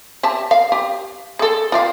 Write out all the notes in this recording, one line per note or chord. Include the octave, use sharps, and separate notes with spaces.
G4 E5 A5
F5
G4
G#4 A4
F4 G4 F5